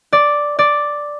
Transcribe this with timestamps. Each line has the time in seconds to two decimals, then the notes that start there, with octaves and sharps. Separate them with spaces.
0.13 D5
0.59 D5